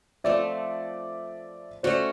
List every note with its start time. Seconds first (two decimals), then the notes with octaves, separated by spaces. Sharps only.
0.24 F3 A3 C4 D5 E5
1.83 A3 C#4 F#4 C5 D5